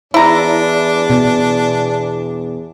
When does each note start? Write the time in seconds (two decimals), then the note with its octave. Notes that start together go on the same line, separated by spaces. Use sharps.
0.14 E2 D4 E4 A#5
1.10 B2